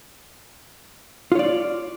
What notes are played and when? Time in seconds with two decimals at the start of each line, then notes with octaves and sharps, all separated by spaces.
1.32 F4
1.35 C#5
1.39 D5